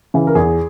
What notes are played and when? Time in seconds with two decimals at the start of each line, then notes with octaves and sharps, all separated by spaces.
0.14 C#3 E3
0.27 A#4
0.35 E2 G#4